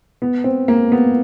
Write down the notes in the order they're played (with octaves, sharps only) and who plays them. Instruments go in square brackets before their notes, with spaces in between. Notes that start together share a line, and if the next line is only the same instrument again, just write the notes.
[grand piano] B3
C4
A#3
B3